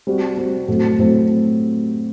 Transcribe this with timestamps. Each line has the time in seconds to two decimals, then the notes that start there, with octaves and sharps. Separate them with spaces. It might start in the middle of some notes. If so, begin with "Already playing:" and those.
0.07 G3 C4 F#4
0.37 G3 C4 F#4
0.68 A2 F#3 C4
0.99 A2 F#3 C4